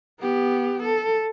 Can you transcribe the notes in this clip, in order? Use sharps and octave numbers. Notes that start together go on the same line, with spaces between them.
B3 G4
A4